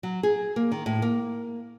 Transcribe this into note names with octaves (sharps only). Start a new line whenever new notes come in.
F#3
G#4
A#3
D#3
A2
A#3